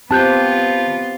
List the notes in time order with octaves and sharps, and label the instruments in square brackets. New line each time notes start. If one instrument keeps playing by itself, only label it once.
[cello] B3 F4 [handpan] C4 G4 [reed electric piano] A5 F#6 G6